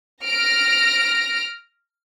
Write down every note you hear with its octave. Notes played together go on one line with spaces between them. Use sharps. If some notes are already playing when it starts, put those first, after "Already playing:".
F6 A#6 D7